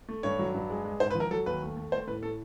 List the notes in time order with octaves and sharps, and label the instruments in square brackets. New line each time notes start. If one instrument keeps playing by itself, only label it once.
[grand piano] A3
G2 C#5
F#3
G2
G#3
G#3
G#2 C5
B4
F3
A#4
F#3 A4
D#2 B4
A3
A3
A3 C5
A2 B4
A3 A4